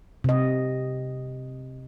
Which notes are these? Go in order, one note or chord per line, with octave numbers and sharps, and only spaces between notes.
C3 D#5